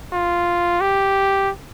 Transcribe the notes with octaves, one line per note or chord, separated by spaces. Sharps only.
F4
G4